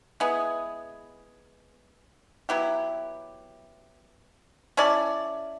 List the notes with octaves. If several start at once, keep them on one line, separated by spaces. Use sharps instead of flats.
G#3 B3 E4 G#4
F#3 B3 E4 G4
C#4 E4 A4 D5